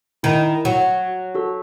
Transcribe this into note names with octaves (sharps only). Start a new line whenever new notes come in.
D#3 E4
F#3 F#4
F#4 A4